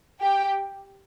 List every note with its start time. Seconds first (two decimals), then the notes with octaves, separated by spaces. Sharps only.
0.20 G4 G5